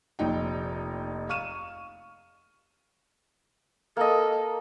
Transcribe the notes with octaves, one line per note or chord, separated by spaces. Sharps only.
F1 A#1 D#4 G5
F5 C#6 F6 D#7 E7
A#3 A4 D#5